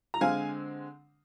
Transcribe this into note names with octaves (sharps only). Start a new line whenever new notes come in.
A#5
D3 G#3 C4 F5 G#5